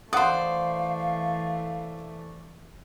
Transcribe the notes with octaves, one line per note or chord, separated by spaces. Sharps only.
E3 A3 C5 D5 F5 F#5 D#6